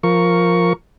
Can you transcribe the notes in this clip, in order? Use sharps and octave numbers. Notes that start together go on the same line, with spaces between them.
F3 A#4 C#6